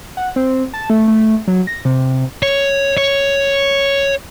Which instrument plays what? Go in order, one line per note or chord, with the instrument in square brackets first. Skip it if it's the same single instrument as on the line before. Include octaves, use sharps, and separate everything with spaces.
[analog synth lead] F#5
C4
A5
A3
A3
F#3
A#6
C3
[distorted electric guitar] C#5
C#5